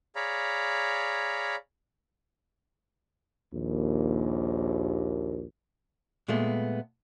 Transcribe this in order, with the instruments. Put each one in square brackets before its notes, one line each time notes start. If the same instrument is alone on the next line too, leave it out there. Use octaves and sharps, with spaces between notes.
[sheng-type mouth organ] G#4 C#5 D5 F5 A#5 B5
[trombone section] A#1 D#2
[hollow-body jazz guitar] A#2 G#3 A3 B3